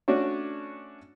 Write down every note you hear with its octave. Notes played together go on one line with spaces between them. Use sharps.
A3 C#4 D4 F#4 C#5